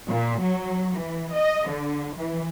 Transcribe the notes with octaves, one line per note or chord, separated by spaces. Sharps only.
A#2
F#3
E3
D#5
D3
E3